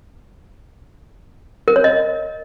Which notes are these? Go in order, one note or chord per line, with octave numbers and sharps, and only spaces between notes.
A#4
C#5
D#5